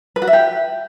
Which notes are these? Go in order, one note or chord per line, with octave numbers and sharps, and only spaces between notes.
B4
F#4
E5
G4